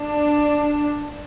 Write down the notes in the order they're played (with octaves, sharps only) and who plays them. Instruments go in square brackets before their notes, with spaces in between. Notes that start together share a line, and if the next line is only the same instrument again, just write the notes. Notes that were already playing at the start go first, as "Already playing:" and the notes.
Already playing: [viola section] D4